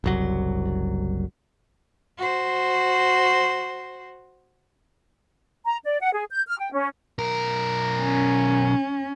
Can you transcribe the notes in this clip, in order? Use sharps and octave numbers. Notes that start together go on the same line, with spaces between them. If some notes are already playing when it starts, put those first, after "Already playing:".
F#1 C2 F#3
F#4 C5
A#5
D5
F#5
G#4
G6
F6
G5
C#4
B1 A#4
C#4